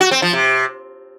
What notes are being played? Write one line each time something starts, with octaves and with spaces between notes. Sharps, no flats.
F#4
C4
F3
C3